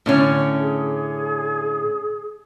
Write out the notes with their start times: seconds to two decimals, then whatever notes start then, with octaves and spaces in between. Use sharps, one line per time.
0.06 A2 D3 C#4
0.60 G#4